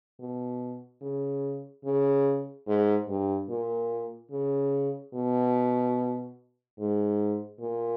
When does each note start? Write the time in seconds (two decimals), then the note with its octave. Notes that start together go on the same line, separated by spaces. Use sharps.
0.19 B2
1.01 C#3
1.85 C#3
2.67 G#2
3.08 G2
3.48 A#2
4.31 C#3
5.14 B2
6.78 G#2
7.60 A#2